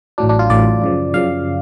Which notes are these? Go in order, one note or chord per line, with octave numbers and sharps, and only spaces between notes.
A1 A2 F#3 D4
D4
F4
A1 A2 F#3 D5
F#2 C#3 F3
F#2 C#3 F3 F5